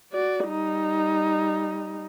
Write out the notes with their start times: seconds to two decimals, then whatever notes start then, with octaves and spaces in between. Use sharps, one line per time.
0.12 F#4 D5
0.48 G3 D#4